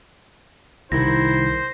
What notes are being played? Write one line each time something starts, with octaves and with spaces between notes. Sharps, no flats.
C2 D#3 E4 C5 A#6